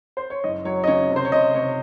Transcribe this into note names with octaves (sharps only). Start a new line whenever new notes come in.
C5
C#5
F#1 D#5
F#3 C#5
D#5
C#3 C#5
C3
C5
C#5
C3 D#5
C3 C#5